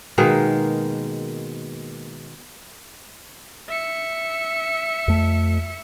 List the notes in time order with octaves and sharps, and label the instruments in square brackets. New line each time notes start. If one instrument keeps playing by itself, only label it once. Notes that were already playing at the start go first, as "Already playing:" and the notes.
[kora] B2 D#3 G#3 A#3
[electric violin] E5 C#7
[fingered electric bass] F2 A3